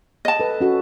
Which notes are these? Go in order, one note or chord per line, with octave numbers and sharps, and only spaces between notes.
D#5 A5
A4 B4
C#4 F#4 A4